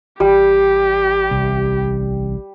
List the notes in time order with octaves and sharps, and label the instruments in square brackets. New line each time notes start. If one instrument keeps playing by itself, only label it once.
[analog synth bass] A1 [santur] G3 [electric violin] G4
[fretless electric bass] C2